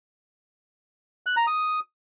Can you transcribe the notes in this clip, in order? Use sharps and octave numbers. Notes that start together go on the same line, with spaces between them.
F#6
A#5
D#6